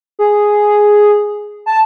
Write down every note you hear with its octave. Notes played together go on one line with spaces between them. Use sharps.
G#4
A5